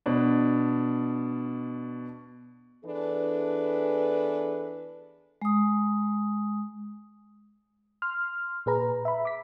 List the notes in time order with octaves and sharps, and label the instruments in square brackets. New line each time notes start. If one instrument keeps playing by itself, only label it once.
[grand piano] B2 D4
[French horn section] E2 E3 D4 G#4 A4 B4
[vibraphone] G#3 D#6
[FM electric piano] C6 F6
A#2 G#4 B4 A#5
E5 B5
D6 B6